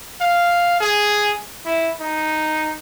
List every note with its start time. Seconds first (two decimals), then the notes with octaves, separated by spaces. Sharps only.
0.21 F5
0.80 G#4
1.65 E4
2.00 D#4